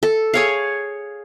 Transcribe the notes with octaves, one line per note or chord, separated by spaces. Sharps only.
A4
G#4 C#5 F5